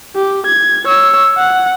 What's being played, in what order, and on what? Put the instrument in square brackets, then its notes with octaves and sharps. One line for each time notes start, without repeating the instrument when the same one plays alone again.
[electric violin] G4
G#6
C#5 E6
F#5